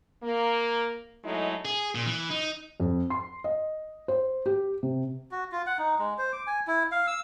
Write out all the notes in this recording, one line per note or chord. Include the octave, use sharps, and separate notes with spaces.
A#3
F#3 G#3 A3 D#4 E4 A4
G#4
A#2
E3
D#4
F2
C6
D#5
C5
G4
C3
F#4
F4
F#5
D#4
G#3
C5
D6
G#5
E4
F5
E6